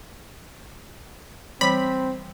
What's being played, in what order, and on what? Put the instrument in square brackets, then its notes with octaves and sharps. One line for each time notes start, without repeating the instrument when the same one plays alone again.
[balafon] E3 G3 C#5 [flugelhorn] C4 [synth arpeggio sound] B5